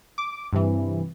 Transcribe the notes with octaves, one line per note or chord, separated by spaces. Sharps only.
D6
G2 C3 E3